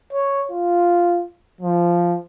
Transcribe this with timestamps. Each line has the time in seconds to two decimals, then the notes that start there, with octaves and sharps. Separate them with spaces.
0.13 C#5
0.51 F4
1.61 F3